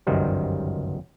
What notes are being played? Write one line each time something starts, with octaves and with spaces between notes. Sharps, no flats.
G1 C#2 F#2 D#3 G3 C5